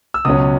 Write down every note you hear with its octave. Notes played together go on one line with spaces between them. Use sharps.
E6
C#2 B2 F#3 C#4 D#6